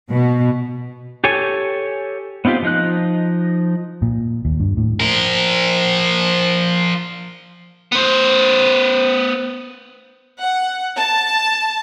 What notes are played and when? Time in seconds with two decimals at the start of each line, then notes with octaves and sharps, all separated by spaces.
0.11 B2
1.24 G4 A4 C#5 G#5
2.45 B3 C4 D#4 F4 G4
2.63 F3 D#4 F#6
4.02 A#2
4.45 D#2
4.60 G2
4.77 A2
5.00 F3 A#4
7.92 B3 C5
10.42 F#5
10.98 A5